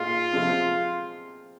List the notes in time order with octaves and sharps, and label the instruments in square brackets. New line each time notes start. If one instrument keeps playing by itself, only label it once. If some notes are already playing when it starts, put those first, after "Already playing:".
Already playing: [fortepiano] A#2 G#3 D#4 G#4 [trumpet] F4
[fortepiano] C3 F3 G#3 C4